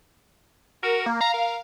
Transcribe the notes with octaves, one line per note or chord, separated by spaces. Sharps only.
F#4 A#4
A#3
F5 A#5
A#4